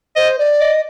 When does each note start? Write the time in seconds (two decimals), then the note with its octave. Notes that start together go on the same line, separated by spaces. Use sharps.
0.16 C5 D#5
0.38 D5
0.60 D5 D#5